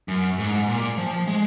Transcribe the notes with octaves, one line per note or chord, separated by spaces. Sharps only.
F#2
G#2
A#2
F3
G#3